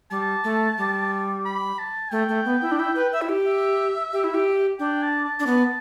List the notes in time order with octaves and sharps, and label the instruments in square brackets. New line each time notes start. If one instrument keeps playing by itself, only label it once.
[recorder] G3 [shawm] A5
[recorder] A3
G3
[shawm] B5
A5
[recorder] A3 [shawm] G5
[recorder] A3
B3
E4
D4
E4
B4
E5
E4
G4
[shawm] E5
[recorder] G4
E4
G4
[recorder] D4 [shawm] G5
[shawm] A5
A5
[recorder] D4
B3